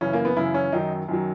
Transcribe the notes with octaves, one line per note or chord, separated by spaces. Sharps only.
F#2 C#3 E3 C#4
A#3
B3
F#2 C#3 E3 E4
C#4
F#2 D#3 F#3 D#4
F#2 D#3 F#3